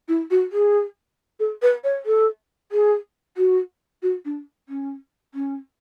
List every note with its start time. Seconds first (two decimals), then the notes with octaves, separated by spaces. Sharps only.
0.08 E4
0.31 F#4
0.52 G#4
1.40 A4
1.62 B4
1.84 C#5
2.06 A4
2.72 G#4
3.37 F#4
4.03 F#4
4.25 D4
4.69 C#4
5.34 C#4